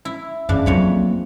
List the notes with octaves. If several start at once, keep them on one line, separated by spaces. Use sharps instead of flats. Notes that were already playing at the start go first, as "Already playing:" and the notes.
E4
F#2 C#3 E3 D4
F2 F#3 A#3 C#5 B5